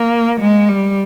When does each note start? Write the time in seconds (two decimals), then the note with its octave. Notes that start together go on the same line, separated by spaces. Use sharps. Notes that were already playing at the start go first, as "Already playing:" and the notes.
Already playing: A#3
0.40 G#3
0.69 G3